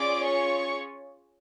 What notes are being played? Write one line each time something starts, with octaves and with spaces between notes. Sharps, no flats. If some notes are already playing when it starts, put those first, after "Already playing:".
Already playing: C#4 F4 G#4 D5 D6
C#5 C#6